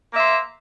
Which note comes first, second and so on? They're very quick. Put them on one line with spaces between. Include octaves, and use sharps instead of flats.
A#3 E5 C5